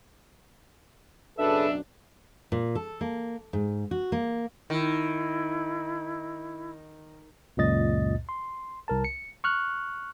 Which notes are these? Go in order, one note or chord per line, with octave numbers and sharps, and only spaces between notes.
B1 F#2 C#3 D4 A4 B4 E5
A#2
A4
A#3
G#2
F#4
A#3
D#3 E4
C#2 F#2 A#2 D#5 A6
C6
C2 A#4 A5
C#7
C#6 F6 F#6